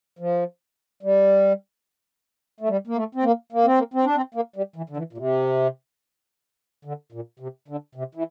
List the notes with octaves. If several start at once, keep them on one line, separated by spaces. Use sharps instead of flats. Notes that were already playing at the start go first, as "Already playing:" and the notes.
F3
G3
A3
G3
A#3
A3
C4
A#3
A#3
C4
A#3
C4
D4
C4
A#3
G3
E3
D3
E3
A#2
C3
D3
A#2
C3
D3
C3
E3